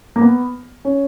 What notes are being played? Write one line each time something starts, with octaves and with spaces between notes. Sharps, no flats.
A#3
B3
C#4